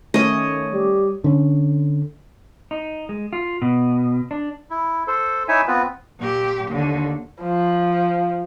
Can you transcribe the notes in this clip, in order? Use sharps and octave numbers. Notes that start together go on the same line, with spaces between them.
D#3 A3 C#4 C#5 D#5
G3 G4
D3 C#4
D#4
G#3
F4
B2
D4
E4
A4 C5
D#4 E4 C#5 E5 G#5
B3 C4 F4 B4
A#2 G4
D#2 D3
F3